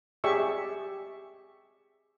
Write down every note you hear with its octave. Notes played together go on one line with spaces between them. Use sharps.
G4 G#4 D5 E5 C#6 E6